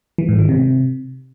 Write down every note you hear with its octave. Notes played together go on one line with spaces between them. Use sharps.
E3
G#2
D#3
C3